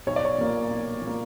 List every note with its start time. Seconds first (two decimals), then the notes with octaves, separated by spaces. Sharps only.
0.07 B1 C#5
0.16 D5
0.25 C#5
0.38 A#2 A#3
0.71 B1
1.02 A#2
1.07 A#3